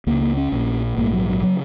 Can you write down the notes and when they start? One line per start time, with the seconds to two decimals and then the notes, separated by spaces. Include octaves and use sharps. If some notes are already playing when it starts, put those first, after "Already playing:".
0.07 C#2 C#3 A#3
0.21 A#3
0.37 C#4
0.52 A#1 A#2
0.97 A#1 G#2 A#3
1.06 G#3
1.13 F#3
1.28 F#3
1.43 C#3 F#3